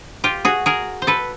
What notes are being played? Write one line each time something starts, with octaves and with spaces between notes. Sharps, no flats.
F4 G4
F#4 G#4
G#4 A#4
C5
A4 B4